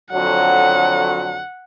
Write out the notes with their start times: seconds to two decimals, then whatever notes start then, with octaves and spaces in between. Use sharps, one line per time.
0.12 F2 D3 F#3 F#5